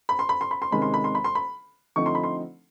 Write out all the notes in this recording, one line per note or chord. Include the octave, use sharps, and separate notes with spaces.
B5
C6
B5
C6
B5
C6
C3 D#3 G#3 C#4 B5
C6
B5
C6
B5
C6
B5
D3 F3 A3 C4 D#4 C#6
C6
B5
C6